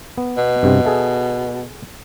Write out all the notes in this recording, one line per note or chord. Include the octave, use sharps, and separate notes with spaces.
B3
B2
G2 C3 C4
G#4 A4 E5